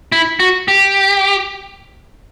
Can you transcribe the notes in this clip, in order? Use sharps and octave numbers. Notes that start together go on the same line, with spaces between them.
E4
F#4
G4